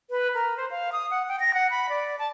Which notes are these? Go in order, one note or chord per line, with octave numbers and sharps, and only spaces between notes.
B4
A#4
C5
F5
D#6
F#5
G5
A#6
F#5
B5
D5
A5